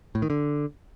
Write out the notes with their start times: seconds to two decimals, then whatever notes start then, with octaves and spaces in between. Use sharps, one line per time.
0.15 A2
0.22 D#3
0.30 D3